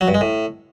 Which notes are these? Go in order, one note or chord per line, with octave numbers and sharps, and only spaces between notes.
F#3
G2
G#3
A2